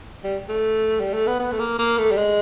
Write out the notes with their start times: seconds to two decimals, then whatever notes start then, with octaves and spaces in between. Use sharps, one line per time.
0.24 G3
0.49 A3
1.00 G3
1.14 A3
1.27 B3
1.39 B3
1.52 A3
1.59 A#3
1.79 A#3
1.98 A3
2.11 G3
2.18 G#3